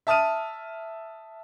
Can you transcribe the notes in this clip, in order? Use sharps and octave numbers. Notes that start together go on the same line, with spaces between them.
E5 A5 D#6 F6 D#7